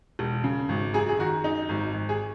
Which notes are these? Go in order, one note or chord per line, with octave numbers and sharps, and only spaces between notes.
E1
C#3
G#1
F#2 G#4
G#4
D#3 F#4
F#2 D#4
G#1
G#1
G#4